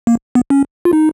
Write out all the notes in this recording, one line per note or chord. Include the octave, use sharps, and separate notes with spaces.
A#3
B3
C#4
F4
D#4